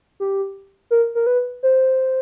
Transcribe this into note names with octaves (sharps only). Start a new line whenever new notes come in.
G4
A#4
A#4
B4
C5